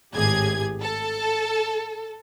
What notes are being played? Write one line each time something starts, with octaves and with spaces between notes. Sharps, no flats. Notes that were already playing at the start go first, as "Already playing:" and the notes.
G#1 A2 G4 G#4 G#6
A4